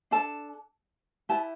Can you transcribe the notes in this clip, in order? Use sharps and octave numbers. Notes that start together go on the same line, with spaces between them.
D4 A4 A5
E4 G4 B4 A5